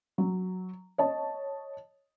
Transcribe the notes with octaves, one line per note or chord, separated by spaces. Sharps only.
F#3
C#5 D#5 A5